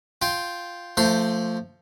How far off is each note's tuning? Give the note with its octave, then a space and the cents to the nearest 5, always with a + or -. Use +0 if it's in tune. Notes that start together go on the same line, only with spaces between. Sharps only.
F4 +0 G5 +0
F3 +0 A3 +25 C6 -10